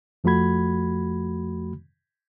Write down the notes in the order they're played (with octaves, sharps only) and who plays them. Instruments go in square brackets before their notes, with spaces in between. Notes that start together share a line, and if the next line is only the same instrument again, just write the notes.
[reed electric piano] F2 F3 A3 F#4 B5 G#6